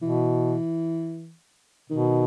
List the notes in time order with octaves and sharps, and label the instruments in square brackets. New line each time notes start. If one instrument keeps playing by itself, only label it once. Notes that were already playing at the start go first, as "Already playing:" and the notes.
[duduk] B2 [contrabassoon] E3
[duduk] B2 [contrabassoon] D#3